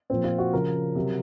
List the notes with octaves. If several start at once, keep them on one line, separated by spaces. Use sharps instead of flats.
A#2 F3 C4
F4
F#4
C#3 F3 A#4
C3 F#3